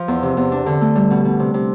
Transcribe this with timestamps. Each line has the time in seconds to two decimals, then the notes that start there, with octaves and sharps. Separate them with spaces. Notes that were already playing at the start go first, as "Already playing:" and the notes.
Already playing: F3
0.08 E2
0.23 C3
0.37 E2
0.52 D4
0.66 D3
0.81 A3
0.96 G3
1.10 B2
1.25 B2
1.40 C3
1.54 C3